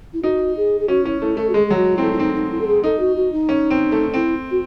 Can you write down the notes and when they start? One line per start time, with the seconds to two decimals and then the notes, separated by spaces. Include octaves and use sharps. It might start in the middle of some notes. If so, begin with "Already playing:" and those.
0.13 E4
0.23 D#4 F#4
0.57 G#4
0.80 G#4
0.88 C#4 F#4
1.05 C#4 E4
1.22 A3 E4
1.37 A3 A4
1.49 F#4
1.54 G#3 G#4
1.67 G#4
1.70 F#3 F#4
1.96 C4 E4
2.03 A3
2.13 E4
2.18 C4 D#4
2.35 D#4
2.51 E4
2.61 A4
2.67 G#4
2.84 D#4 A4
3.00 F#4
3.16 F#4
3.32 D#4
3.49 C#4
3.70 C4
3.92 A3
4.14 C4 E4
4.51 F#4